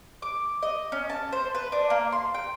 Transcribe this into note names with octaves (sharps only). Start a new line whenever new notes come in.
D6
D#5
C#4
A5
C5
B4
D4
A#3
C6
G5